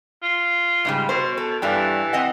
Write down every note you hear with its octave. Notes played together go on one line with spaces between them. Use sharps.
F4
G#2 C#3 G3
B2 C5
A4
G2 E3 D4 G4
C4 D#5 F#5